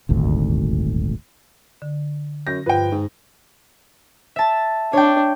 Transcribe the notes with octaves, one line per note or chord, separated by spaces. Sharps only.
D#1 G#1 D2
D3
F#2 G6 A#6
G2 F3 B4 G5
G#2
E5 A5
D4 C#5 G5